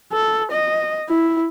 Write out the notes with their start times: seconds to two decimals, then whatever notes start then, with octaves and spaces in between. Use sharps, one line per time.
0.12 A4
0.52 D#5
1.09 E4